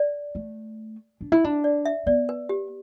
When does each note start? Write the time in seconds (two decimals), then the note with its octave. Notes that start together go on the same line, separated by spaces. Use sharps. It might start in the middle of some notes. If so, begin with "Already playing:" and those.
Already playing: D5
0.35 A3
1.21 D4
1.32 E4
1.44 D4
1.64 D5
1.86 E5
2.06 B3 D5
2.29 B4
2.49 G4